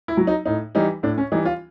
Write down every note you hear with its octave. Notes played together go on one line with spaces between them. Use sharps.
E4
F#3
D#4
A2 D#4
E3 G3 D#4
A2 D4
C#4
E3 G3 D#4
F4